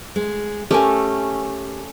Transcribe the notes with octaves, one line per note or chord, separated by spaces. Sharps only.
G#3
A3 C#4 G4 A#4 G#5